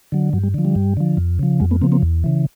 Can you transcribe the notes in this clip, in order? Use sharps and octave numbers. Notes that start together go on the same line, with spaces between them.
D3 F#3
G2 F#3
G3
D3 F3
G3
G2
D3 F3
F2
C#3 F3
F2 F#3 G#3
A3 B3
C#3 F3 A#3 C4
A#3 C4
E2
C#3 E3